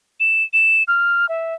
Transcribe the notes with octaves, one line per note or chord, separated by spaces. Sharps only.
E7
E7
F6
E5